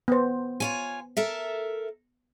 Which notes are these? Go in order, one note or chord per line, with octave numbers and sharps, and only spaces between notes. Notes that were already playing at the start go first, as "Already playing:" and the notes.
B3 C5
F4 C#5 G#5
A4 A#4 E5